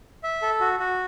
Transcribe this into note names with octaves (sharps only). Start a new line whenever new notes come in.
E5
A4
F#4
F#4